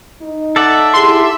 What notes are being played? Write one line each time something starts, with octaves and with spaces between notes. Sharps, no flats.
D#4
A4 D5 E5 F#5
E4 G4 G#4 C6